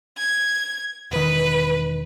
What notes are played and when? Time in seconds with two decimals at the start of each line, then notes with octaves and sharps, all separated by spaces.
0.18 G#6
1.11 E1 D#3 B4